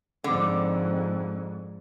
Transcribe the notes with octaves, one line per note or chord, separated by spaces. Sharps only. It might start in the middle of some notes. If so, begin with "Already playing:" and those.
F2 G#2 D3